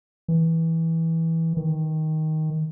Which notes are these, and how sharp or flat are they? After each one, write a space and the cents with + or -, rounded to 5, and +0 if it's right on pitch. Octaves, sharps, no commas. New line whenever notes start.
E3 -15
D#3 +10